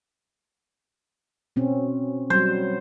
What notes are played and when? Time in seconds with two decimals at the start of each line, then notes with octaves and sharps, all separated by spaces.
1.56 B2 C4 C#4
2.30 F#3 G3 C5